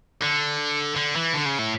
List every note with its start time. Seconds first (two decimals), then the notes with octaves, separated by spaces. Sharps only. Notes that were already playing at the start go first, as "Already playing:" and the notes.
0.23 D3
0.96 D3
1.16 E3
1.34 D3
1.46 C#3
1.59 A2